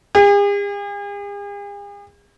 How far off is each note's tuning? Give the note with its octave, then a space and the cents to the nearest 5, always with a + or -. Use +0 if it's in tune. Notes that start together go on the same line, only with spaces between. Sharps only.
G#4 -45